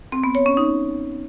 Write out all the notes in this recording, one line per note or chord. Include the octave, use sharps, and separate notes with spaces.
C4
B3
C#5
C#4
D#4